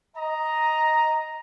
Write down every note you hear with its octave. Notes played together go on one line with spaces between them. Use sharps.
D#5 A#5